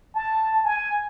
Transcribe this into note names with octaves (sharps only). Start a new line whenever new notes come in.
A5
G#5